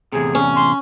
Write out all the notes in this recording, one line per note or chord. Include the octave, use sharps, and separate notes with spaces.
E2 A2 C3 G#4
C#4
C6